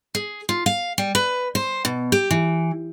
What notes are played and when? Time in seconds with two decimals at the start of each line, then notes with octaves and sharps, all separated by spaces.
0.15 G#4
0.49 F4
0.66 F5
0.98 G3
1.15 B4
1.55 C5
1.85 B2
2.12 G4
2.31 E3